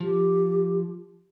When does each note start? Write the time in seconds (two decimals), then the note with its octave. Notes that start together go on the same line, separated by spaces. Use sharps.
0.01 F3 G4